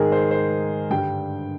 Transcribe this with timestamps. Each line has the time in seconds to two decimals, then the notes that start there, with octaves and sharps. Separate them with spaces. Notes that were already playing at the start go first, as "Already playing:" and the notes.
Already playing: G#2 D#3 G#3 G#4 A#4
0.12 C5
0.31 C5
0.90 G2 D3 G3 G5